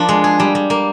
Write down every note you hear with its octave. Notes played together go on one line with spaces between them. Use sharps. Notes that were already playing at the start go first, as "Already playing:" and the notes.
Already playing: F3 A#3 D4
G#3
G#4
G3
G3
A#3